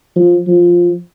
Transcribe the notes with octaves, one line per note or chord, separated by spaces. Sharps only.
F3
F3